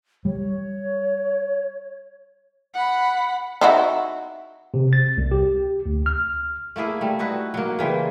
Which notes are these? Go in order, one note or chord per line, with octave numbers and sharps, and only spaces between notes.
G3 C#5
F#5 B5
D#4 E4 F#4
C3
A6
C2
G4
D2
F6
A3 A#3 E4 G#4
G3 A3
D#4 E4 F#4 B4
F#3 A#3
C#3 E3 G3 C4